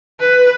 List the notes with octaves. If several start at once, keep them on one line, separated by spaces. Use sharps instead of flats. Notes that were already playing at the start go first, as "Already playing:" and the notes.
B4